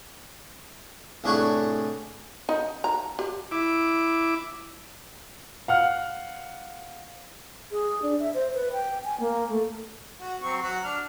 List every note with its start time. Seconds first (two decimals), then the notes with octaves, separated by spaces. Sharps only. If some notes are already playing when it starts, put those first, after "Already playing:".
1.24 C2 A2 D4 G#4 F#5 C#6
2.49 D#4
2.84 A#5
3.19 G4
3.51 E4 D6
5.68 F5 F#5 F6
7.72 G#4
8.02 D4
8.20 E5
8.34 C5
8.54 B4
8.73 G5
9.05 G#5
9.20 A#3
9.50 A3
10.20 F#4
10.42 F#3 C4 C#6
10.62 F#3 F#4 F#5
10.84 D4 F6